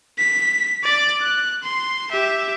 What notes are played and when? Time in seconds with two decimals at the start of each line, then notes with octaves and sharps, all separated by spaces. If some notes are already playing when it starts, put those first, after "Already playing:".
0.18 B6
0.84 D5 D6
1.22 F#6
1.64 C6
2.11 G4 E5